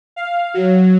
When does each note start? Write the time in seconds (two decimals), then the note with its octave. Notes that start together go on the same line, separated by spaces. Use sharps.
0.16 F5
0.54 F#3